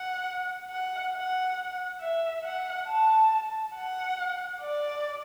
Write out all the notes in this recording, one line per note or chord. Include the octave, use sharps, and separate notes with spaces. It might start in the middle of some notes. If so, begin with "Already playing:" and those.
Already playing: F#5
F#5
F#5
E5
F#5
A5
F#5
D5